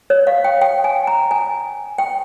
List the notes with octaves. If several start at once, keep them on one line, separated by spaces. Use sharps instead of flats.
C#5
F5
G5
G5
G#5
A#5
G#5
G5